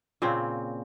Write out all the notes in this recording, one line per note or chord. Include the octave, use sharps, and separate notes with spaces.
A#2 C#3 C4